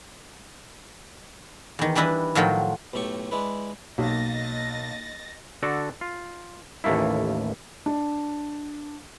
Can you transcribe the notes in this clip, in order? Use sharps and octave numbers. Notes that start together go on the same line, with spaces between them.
E2 D#3
E3 G3 D4 E4 B4 D#5
A2 D#3 F3 F#3 F4 G5
B1 A2 A3 G4 C#6
G#3 D4 E4 B4
B1 A#3 D#5 A6 A#6
D3 F#4 A4 D5
F4
A1 D#2 A3 A#3 E4
D4